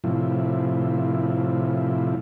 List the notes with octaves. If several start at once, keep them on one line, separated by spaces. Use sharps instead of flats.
A2 C3 F3 E4